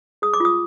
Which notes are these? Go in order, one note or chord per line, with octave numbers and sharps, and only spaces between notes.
G#4 D#6
D6
F4 D#6